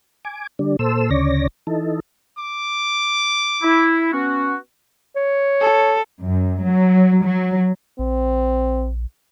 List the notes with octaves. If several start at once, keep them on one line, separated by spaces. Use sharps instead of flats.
G#5 D6
D3 G3 D4
A#2 A4 C5 E6
D2 C#3 C#5 D5 A#6
E3 D#4 A4
D6
E4
B3 C#4 F#4
C#5
A4
F#2
F#3
F#3
A#1 C4